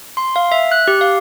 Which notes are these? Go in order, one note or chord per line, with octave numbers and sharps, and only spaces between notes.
C6
F5
E5
F#6
G4
F5